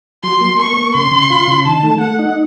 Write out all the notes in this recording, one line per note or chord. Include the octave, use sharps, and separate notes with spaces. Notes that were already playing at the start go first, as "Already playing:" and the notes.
F#3 C6
A#3
A#3 C#6
A#3
C#3 C6
C#3
F4
C#3
D#3 A5
A3
A3 F#5
D#4